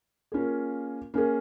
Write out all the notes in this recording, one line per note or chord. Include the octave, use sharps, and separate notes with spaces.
A#3 C#4 F4 G#4
A#3 C#4 G#4